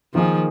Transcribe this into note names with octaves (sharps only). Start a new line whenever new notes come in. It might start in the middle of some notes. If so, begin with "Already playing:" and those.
D#3 F3 A#3 D#4 G#4